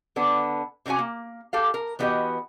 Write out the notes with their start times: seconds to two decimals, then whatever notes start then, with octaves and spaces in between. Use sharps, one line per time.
0.16 D3 B3 D4
0.86 C3 D#3 C#4 F#4 G#5
0.99 A#3
1.53 G4 A4 F5
1.74 A#4
1.99 E3 B3 D#4 F#4 G4 D#5